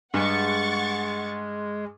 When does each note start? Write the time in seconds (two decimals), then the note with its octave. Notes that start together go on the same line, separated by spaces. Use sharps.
0.14 G2 G#3 F#5 C#6 A6